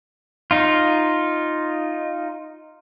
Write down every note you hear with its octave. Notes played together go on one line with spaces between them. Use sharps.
D#4 F4